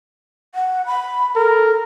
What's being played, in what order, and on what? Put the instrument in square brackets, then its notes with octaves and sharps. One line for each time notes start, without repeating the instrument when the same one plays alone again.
[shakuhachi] F#5
B5
[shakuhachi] A4 [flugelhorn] A#4